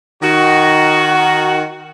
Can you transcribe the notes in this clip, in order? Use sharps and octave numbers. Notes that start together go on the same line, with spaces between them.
D#3 F#4